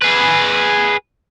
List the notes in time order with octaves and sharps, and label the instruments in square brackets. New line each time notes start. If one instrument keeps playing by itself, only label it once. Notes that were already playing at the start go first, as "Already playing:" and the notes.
[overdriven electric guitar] G#4 B4